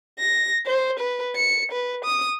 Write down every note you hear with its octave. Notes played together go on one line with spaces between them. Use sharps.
A#6
C5
B4
C#7
B4
D#6